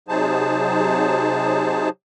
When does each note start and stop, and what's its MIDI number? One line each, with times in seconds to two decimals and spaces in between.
0.08 1.89 48
0.08 1.89 54
0.08 1.89 63
0.08 1.89 68
0.08 1.89 72
0.08 1.89 81